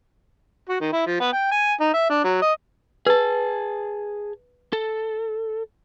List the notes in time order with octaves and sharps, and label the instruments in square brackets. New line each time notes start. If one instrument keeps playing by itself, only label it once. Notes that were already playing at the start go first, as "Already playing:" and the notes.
[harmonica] F#4
D#3
E4
F3
B3
G5
G#5
D#4
E5
D4
F#3
D#5
[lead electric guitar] G#4 A5 [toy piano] B4
[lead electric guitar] A4